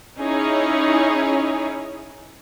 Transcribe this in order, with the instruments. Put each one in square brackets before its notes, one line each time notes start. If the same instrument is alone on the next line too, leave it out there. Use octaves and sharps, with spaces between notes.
[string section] C#4 D#4 E4 G#4 C#5